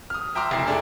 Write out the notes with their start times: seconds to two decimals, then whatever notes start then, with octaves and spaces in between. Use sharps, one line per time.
0.10 D#6 F6
0.35 E5 G5 A#5 C6 D6 F6
0.51 F1 E4 C7
0.67 A3 D4 G#4